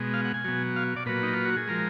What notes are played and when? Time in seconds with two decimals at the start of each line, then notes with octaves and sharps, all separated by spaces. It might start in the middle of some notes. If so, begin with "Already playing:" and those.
Already playing: B2 G#3
0.14 F5
0.25 F#5
0.34 G#5
0.44 B2 F#3
0.76 F5
0.96 D5
1.06 A#2 F#3 B4
1.23 D#4
1.33 F4
1.45 F#4
1.56 G#4
1.68 F3 G#3 A#4